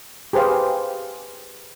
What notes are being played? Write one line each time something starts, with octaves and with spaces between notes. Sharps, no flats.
G4 G#4 B4 C5 F5